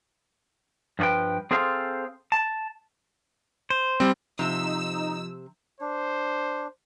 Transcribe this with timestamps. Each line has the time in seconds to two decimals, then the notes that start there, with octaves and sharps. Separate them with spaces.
0.99 G2 F3 F#4 B4 G5
1.51 C4 G#4 A4 C5 F5
2.32 A5
3.70 C5
4.00 G3 C4
4.39 C3 F3 D#4 E6
5.81 D4 C5